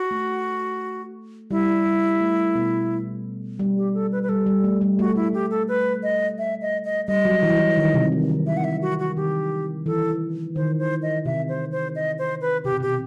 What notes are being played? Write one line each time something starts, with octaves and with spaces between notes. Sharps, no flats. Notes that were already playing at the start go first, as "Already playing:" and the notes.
Already playing: F#4
A3
G3 E4
G3
A3
B2 B3
G3
G4
A4
B4
B4
G3 A4
G3
A3
G3
A3 F#4
G3
A3 E4
G3 G4
A4
B4
D#5
E5
D#5
D#5
G3 D#5
F#3
E3
E3
D#3
C3
D#3
D#3
C3 E5
F#5
E5
F#4
F#4
D#3 G4
E3 A4
D#3 C5
C5
D#5
C3 E5
C5
C5
D#5
C5
B4
C3 G4
B2
C3 G4